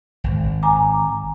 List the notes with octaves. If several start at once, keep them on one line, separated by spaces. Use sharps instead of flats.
G#1
G#5 A#5 D6